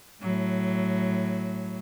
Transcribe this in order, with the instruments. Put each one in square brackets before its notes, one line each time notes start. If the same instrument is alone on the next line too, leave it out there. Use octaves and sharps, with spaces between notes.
[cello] A2 F#3